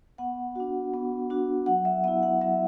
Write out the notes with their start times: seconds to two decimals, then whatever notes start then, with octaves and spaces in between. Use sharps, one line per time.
0.18 B3 F#5
0.55 D4 F#4
0.94 B3
1.30 D4 F#4
1.66 F#3 F#5
1.85 E5
2.04 B3 E4 E5
2.23 F#5
2.41 F#3 E5